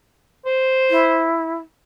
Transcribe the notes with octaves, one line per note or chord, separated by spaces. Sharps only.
C5
E4